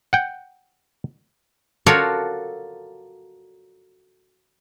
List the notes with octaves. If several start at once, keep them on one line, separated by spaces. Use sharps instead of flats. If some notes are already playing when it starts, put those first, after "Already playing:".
F#5 G5
F4 F#4 A4 A#4 C#5 D5